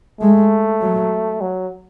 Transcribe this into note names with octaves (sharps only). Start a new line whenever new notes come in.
G#3 A3
F#3
F#3